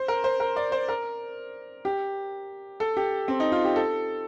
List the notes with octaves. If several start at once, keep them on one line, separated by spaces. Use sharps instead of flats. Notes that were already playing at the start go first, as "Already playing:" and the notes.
Already playing: C5
A#4
C5
A#4
D5
C5
A#4
G4
A4
G4
C4
D#4
F4
G4
A4